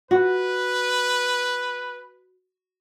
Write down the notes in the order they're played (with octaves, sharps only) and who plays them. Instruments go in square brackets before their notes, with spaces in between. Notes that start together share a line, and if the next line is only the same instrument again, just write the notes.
[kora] F#4 [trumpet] B4